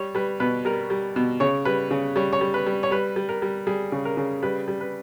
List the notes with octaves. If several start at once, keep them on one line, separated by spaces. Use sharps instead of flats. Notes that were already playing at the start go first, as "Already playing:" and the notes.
Already playing: G3 C#5
G3 B4
B2 B4
G3 A#4
G3
B2
C#3 C#5
G3 B4
C#3
G3 C#5
C#5
G3
B4
G3
C#5
G3 B4
G3
A#4
G3
G3 G#4
C#3
A#4
C#3
G3 B4
G3
B4